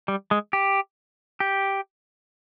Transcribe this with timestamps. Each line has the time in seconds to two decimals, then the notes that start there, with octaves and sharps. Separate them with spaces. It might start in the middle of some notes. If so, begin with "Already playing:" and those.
0.08 G3
0.31 G#3
0.53 G4
1.40 G4